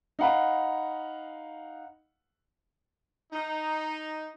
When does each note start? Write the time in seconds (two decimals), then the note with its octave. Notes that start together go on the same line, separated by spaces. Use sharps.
0.19 D#4 F5 F#5 B5
3.33 D#4